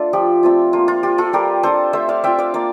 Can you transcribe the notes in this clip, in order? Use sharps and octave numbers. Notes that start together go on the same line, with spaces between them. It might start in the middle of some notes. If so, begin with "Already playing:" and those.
Already playing: A3 D4 F4 A4
F3 G4
A3 C4 F4
A#3 F4
F4
F4 G4
F4 A4
G3 G4 A#4
D4 F4 A4 C5
A3 C5 E5
D5 F5
C4 F4 E5 G5
D5 F5
A#3 D5 F5